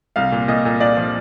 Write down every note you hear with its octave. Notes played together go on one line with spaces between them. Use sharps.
C2 F5
A#2
A#2 D#5
A#2
A#2 D5
F3